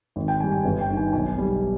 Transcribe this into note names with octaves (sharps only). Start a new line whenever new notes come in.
G#1
G5
G2 G3 G#5
G#5
G1
G5
G2 D#3
G#5
B1 G#5
B2 G3